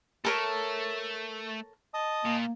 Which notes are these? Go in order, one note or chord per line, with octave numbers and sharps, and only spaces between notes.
A3 A4 A#4 C#5
D#5 A5 D#6
A#2 A#3